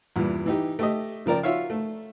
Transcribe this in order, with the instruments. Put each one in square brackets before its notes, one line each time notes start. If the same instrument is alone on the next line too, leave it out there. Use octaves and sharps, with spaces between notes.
[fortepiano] E2 G2 A#2
E3 D#4 G4
A3 G4 D#5
C#3 F3 A#4 D5 G5
F4 F#4 C#5 E5 F5
A3